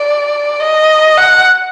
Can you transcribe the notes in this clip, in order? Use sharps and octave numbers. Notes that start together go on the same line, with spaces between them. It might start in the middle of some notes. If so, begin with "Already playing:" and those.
Already playing: D5
D#5
F#5